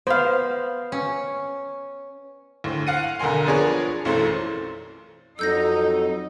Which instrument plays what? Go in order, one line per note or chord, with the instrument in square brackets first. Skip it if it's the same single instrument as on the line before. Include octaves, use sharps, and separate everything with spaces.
[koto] B3 [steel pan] C5 F5
[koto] C#4
[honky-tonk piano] D2 A2 C5
F5 F#5 D#7
B1 D3 A#4 G#5 C6
F3 B3 D4 G#4 A#4 C#5
B1 F#2 E3 A3 C5
[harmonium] F2 F#3 [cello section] D#4 [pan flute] A4 [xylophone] E6 G6 A#6